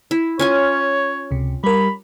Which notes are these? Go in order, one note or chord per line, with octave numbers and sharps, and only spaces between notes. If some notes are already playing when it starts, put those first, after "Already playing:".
E4
C#4 F4 C#5 G#5
C#2 C3
G3 A#4 B5